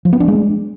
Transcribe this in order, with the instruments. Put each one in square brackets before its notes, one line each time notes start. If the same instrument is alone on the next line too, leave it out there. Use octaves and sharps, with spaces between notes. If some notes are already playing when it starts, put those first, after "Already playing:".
[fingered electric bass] F3
B3
D4
G#3